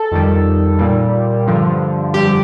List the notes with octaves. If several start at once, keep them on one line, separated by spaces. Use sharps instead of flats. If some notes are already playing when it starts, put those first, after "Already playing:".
Already playing: A4
F2 D#3 G3
A#2 G3
G2 D3 F3
F2 D3 G3 G4